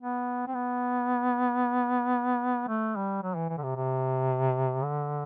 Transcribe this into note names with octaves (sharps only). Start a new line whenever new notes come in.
B3
C4
B3
A3
G3
F#3
E3
E3
D3
C3
C3
D3